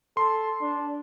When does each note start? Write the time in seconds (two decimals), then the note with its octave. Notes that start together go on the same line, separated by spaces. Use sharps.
0.17 A4 C6
0.61 D4